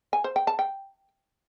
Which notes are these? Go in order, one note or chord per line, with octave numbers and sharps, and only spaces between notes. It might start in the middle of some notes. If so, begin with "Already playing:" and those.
G#5
C5
G5
A5
G5